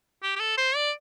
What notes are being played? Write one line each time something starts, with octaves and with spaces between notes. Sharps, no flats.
G4
G4
A4
C5
D5